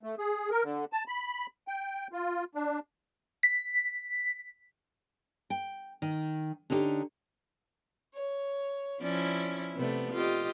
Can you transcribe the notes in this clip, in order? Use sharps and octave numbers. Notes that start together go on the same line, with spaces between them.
A3
G#4
A#4
D3
A5
B5
G5
F4
D4
B6
G5
D#3
D3 C#4 D#4 F#4 G4
C#5
F3 C#4 E4 D5
C3 A3 B3 D5
F4 G4 D#5